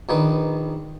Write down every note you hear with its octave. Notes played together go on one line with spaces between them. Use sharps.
A#1 D#3 B4